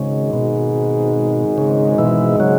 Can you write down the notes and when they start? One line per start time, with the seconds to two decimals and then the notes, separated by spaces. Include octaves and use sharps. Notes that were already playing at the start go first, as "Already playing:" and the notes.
Already playing: G#1 G#2 C#3 G#3
0.33 B2
1.58 C#3
1.98 B2 E3
2.40 C#3 F#3